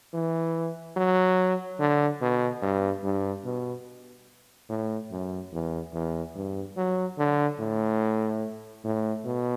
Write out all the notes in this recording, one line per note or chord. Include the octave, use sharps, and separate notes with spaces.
E3
F#3
D3
B2
G2
G2
B2
A2
F#2
E2
E2
G2
F#3
D3
A2
A2
B2